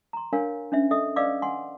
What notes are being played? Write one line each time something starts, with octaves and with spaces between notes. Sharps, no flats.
A#5 C6
D4 A#4 C#5 F5 G#5
C#4 D4 C5 E5
A4 D#5 E5 D#6
B4 D5 D#5 F5 D6 E6
F#5 G#5 C6